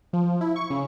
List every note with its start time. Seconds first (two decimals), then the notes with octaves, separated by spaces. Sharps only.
0.13 F3
0.41 E4
0.56 C#6
0.70 C#3